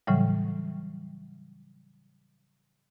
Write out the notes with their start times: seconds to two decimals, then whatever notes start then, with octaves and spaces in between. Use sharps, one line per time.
0.07 A2 C#3 E3 F#3 G3